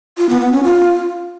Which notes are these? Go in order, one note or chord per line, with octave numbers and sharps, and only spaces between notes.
F4
B3
B3
C#4
F4